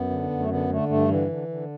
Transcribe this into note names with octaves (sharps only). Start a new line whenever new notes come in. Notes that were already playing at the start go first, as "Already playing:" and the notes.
Already playing: F#2 B3
D3
F#2
A3
D3 B3
D3 A3
G2 A3
D3 E3
D3
D3